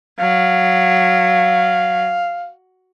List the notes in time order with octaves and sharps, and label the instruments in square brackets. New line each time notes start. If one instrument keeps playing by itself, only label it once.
[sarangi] F#3 [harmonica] F5